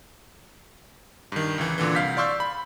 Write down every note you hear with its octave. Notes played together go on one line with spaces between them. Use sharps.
G2 D#3
C#2 E3
A#2 D3 E3
C2 F5 G6 B6
D5 F5 C6 C#6 E6 G6
B5